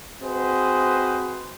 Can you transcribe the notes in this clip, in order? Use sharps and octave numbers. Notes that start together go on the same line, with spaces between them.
C4 F#4 G#4 B4 C5 D#5